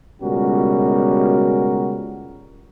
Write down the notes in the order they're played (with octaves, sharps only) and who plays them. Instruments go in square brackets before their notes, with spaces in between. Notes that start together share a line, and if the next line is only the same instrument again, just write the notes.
[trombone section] C#2 B2 G3 C#4 F#4 A#4